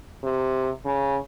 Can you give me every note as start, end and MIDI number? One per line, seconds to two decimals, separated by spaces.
0.23 0.70 48
0.85 1.17 49